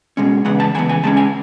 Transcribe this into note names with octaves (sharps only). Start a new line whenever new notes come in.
B2 G#3 C#4
E2 C#3 G#3 B3 F#5
A5
C#3 E3 B3 G#5
G#5
C#3 G#3 C#4 A5
G#5